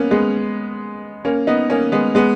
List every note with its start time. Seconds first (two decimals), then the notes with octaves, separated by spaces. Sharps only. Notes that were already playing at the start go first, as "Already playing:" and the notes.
Already playing: A#3 B3 C#4
0.11 G#3 B3
1.25 A#3 C#4
1.47 B3 D#4
1.70 A#3 C#4
1.92 G#3 B3
2.15 G#3 B3